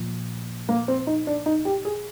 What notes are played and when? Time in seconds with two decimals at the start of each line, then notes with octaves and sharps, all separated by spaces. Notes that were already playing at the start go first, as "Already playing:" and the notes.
Already playing: A#2 F3
0.69 A#3
0.88 C4
1.07 D#4
1.27 D4
1.46 D#4
1.65 G4
1.85 G#4